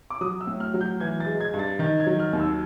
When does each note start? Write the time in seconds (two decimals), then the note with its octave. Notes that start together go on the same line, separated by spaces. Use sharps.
0.10 D6
0.21 F#3 D#6
0.41 E6
0.47 A2
0.60 F6
0.74 F#3
0.81 G6
1.00 E3 G#6
1.20 A6
1.26 G#3
1.41 G#6
1.53 G2
1.59 A6
1.79 D#3 A6
2.00 G#6
2.07 F#3
2.19 F6
2.33 D#2
2.40 E6